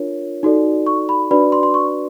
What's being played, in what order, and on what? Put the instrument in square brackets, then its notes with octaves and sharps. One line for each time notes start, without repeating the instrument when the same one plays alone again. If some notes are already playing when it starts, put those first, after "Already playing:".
Already playing: [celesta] D4 F4 A#4 C#5
D#4 F#4 A4 D5
C#6
B5
D4 F#4 B4 D5 B5
C6
C6
C#6